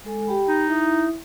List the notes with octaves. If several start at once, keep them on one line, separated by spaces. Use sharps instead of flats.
G#3 A4 G#5
G4 G5 B5
D#4
E4 E5 D#6